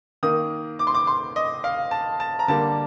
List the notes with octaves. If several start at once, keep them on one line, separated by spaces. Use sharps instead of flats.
D#3 A#3 D#6
D6
C6
D6
C6
D#5
F5
A5
A5
A#5
D3 G3 A#3 A5